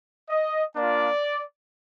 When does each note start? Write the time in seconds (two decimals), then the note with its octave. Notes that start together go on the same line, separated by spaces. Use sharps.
0.28 D#5
0.75 A#3 D4 F4 D5